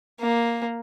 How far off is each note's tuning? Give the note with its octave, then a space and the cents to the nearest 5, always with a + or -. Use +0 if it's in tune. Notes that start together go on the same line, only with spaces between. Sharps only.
A#3 +5